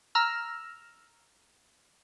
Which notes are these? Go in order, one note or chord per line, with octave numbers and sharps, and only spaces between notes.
A#5 E6 F6